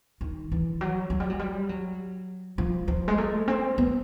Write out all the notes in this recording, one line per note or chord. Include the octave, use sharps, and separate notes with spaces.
D#3
E3
F#3
F#3
G3
F#3
G3
F#3
F3
F3
G#3
A3
C4
B3